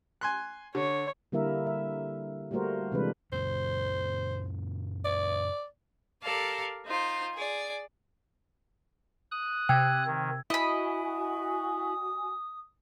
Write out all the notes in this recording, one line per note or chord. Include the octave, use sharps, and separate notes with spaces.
G#5 C6 F#6
D3 C#5
D3 G3 A#3 E4 A#4 E5
E5
G3 A3 A#3 F#4 A#4 C5
C3 E3 G3 G#3 D4 B4
F#2 A#2 C#3 C5
D5
G4 A4 A#4 D5 F5
D#4 F4 C5
G#4 D5
D#6 F#6
C3 G5 E6 G#6
D#3
E4 F#4 D#5 G#5 B5 D#6